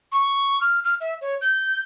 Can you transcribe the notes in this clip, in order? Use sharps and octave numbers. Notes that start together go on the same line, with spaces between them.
C#6
F6
F6
E5
C#5
G6